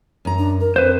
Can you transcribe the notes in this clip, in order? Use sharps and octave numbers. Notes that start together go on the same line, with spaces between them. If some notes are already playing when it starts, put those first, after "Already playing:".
F#2 A#5
D4
A#4
F2 B4 C5